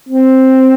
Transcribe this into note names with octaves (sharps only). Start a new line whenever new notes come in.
C4